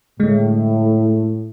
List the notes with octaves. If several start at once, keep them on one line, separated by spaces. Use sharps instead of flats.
A2 D3 G#3